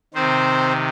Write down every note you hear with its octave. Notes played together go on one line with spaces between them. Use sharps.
C3 D#3 C4 C5